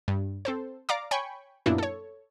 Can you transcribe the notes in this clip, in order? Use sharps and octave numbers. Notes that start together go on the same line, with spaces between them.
G2
C4 A4 C5
D5 F5 A#5 D6
C#5 G5 G#5 B5 C#6
F#2 A#2 A#3 B3 D4 E4
A4 C#5